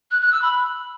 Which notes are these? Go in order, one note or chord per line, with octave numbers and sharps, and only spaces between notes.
F#6
F#6
E6
B5